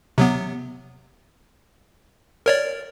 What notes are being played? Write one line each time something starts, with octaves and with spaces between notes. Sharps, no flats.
C3 F#3 B3
A#4 C#5 D5